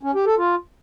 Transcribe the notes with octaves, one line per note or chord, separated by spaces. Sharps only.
C#4
G4
A4
F4